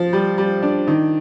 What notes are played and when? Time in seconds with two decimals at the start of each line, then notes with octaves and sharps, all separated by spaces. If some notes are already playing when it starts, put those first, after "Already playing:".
Already playing: F3
0.13 G3
0.38 G3
0.63 D4
0.87 D#3